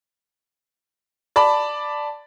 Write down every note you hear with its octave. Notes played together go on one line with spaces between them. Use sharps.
D5 A5 B5